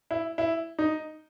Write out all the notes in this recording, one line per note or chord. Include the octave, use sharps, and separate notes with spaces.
E4
E4
D#4